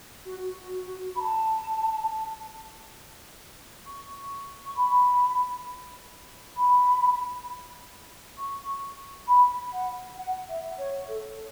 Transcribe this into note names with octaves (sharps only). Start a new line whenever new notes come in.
F#4
F#4
F#4
B5
A5
C#6
C#6
B5
B5
C#6
B5
F#5
F#5
E5
C#5
A4